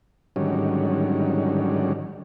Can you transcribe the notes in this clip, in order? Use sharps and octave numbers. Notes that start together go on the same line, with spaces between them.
G#2 D3 D#3 F#3 G3 C#4